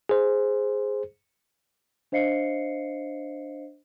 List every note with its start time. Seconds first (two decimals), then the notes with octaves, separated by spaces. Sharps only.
0.09 G#4 C5
2.12 D4 C5 D#5 F5 C7 C#7